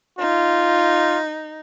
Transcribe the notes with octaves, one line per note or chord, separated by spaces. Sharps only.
D#4 F4